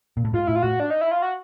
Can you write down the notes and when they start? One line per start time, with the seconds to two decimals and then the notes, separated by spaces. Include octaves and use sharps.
0.17 A#2
0.25 A2
0.33 G#2 F4
0.47 A2 E4
0.56 F4
0.63 A2 F#4
0.80 D4
0.90 D#4
1.01 E4
1.11 F4
1.22 F#4